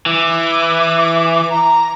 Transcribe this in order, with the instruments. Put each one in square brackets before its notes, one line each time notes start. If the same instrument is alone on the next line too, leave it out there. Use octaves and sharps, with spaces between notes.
[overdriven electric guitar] E3 [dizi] D6
[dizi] A#5